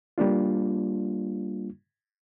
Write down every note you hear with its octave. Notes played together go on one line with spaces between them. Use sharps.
G3 A#3 D4 F4